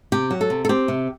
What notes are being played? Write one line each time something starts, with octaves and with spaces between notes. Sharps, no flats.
C3 G4
F#3
A4
C3
A4
C4 G4
C3